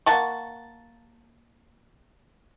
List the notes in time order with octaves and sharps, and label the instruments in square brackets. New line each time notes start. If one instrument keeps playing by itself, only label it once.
[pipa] A#3 F#5 A5 C#6